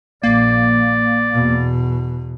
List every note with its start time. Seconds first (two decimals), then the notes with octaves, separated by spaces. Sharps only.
0.23 A#1 A#3 D5
1.33 E2 B2